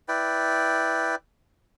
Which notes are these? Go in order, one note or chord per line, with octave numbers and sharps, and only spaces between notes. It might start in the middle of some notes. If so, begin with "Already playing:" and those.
E4 B4 D5 G5